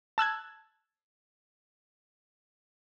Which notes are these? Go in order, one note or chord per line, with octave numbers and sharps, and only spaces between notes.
A5 E6 F#6 G#6